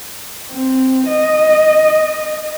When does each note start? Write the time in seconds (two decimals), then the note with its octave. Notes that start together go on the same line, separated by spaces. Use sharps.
0.50 C4
1.07 D#5